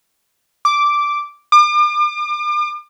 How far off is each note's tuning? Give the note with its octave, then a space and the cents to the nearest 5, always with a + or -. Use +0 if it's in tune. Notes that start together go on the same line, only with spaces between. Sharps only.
D6 -5
D6 +40